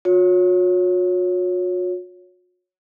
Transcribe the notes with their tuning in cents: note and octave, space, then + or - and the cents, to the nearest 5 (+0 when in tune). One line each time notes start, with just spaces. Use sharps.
F#4 -45 C#5 +0